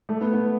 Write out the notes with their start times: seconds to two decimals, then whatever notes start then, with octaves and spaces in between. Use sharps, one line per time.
0.09 A3
0.21 B3
0.33 B3